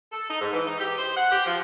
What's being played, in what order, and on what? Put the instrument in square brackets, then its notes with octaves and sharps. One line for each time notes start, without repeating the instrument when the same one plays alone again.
[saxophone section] A4
D#4
G#2
E3
D#4
G4
C5
F#5
G4
F3